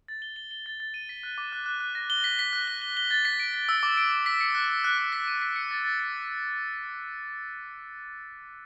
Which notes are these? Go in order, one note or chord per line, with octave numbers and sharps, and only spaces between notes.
A6
G7
G7
G7
A6
A6
D#7
B6
F#6
D6
F#6
F#6
F#6
A#6
G7
B6
B6
F#6
G7
G7
G7
A6
B6
D7
B6
E6
D6
D7
D7
B6
C#7
F#6
F#6
F#6
F#6
B6
D#7
B6
C#7
A6
A6
C#7